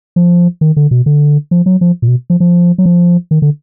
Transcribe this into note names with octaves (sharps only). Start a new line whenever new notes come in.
F3
D#3
D3
B2
D3
F3
F#3
F3
A#2
B2
F3
F3
F#3
F3
D#3
D3